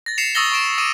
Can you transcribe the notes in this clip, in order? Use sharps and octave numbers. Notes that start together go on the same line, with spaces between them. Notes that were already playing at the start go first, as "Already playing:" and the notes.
A6 A#6
C7 C#7 E7 F7
C#6 D#6 E6 A6 A#6 G7
C#6 D7 E7
D6 D#6 D#7 E7